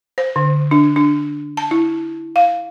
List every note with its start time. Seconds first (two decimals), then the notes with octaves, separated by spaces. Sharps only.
0.18 C5
0.36 D3
0.71 D4
0.96 D4
1.57 A5
1.71 E4
2.36 F5